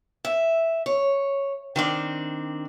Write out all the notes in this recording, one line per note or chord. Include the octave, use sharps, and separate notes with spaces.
E5
C#5
D#3 C4 D4